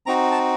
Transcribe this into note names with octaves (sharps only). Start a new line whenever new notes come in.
C4 D#4 F#4 A#5
A5